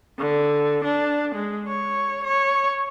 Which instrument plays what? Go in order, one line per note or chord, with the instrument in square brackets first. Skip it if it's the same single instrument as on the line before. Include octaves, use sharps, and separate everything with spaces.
[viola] D3
D4
G#3
C#5
C#5